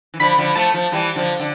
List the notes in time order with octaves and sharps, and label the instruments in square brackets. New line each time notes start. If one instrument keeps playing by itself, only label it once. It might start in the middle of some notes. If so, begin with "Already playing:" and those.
[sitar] E3
[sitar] D3 F3 [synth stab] B5
[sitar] D3 F3
[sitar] F3 A3 [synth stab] A5
[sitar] F3 A3
E3 G3
D3 F3
D3